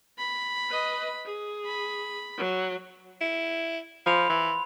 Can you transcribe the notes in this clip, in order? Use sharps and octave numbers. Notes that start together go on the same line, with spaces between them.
B5
B4 D#5
G#4
B5
F#3
E4
F3 B5 C6 F7
E3